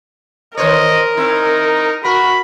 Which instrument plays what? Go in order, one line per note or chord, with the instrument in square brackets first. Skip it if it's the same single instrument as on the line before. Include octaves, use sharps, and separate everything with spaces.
[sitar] D#3 C5 C#5 [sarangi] A#4 [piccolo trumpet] D#5
[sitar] C4 E4 [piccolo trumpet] D#4
[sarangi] F#4 [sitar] A#4 [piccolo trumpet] B5